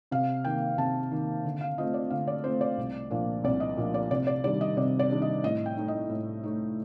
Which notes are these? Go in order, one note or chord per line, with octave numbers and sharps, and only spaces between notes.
C3 F5
D#3 A#3 G5
C3 A5
D#3 A#3
D3
F5
A3 C4 F4 D#5
D5
D3 F5
D5
A3 C4 F4 C5
D5
C2
A#2 F3 A#3 D4
C2 D5
D#5
A#2 F3 A#3 D4
D5
C3 D5
D5
D#3 G3 D4 D5
D#5
C3 D5
D5
D#3 G3 D4
D#5
A2 D#5
G5
A3 D#4
D#5
A2
A3 D#4